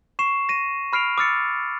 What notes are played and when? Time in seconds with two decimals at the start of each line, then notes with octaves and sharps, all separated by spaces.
0.19 C#6 C7 E7
0.49 A#6 D#7
0.93 B5 F6 C7 D7 F7
1.18 D6 E6 F6 A6 C#7